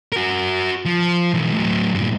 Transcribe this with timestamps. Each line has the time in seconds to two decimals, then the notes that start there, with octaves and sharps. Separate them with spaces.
0.12 F#4 A#4
0.85 F3
1.34 B1 E3
1.54 A2 F#3
1.94 G2 A#2